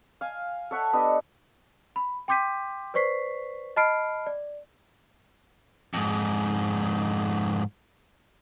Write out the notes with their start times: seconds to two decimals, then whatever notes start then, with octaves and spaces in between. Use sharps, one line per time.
0.21 F5 G#5
0.71 A4 C#5 E5 F#5
0.93 B3 D4 G4 D#5
1.96 B5
2.28 G5 C6 D6 G6 B6 D#7
2.94 B4 C5 D5 C#6 B6 C7
3.76 D#5 A5 B5 F6 C7 D7
4.26 D5
5.94 F2 G#2